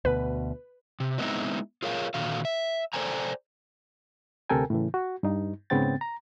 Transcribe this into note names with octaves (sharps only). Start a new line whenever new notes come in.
D2 B2 B4
C3
F#3 G#3 B3 C4 D#4 E4
F4 G#4 A#4 C#5 F5
A#2 D3 D#3 F#4 F5
E5
A4 C5 D5 G5 G#5 A#5
D2 C3 A4 A#4 G5 G#5
A2 C#3 E3
F#4
G2 D#4
G#2 C#3 B3 C4 G5 A6
A#5